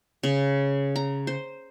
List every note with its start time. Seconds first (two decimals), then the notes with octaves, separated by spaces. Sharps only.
0.23 C#3
0.96 A#5
1.27 C5